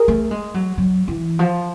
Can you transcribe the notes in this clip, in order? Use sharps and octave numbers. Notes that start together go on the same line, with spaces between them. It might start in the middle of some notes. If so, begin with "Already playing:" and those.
Already playing: G#4 A#4
A3
G#3
F#3
F#3
E3
F3